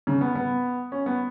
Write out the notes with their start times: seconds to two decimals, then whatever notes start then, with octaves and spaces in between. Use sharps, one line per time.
0.07 C#3
0.21 B3
0.35 B3
0.92 C#4
1.06 B3